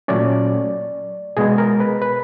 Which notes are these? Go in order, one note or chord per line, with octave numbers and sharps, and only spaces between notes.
A#2 F#3 A3 C#4 D5
B2 G#3 B3 G#4
A#4
B4
B4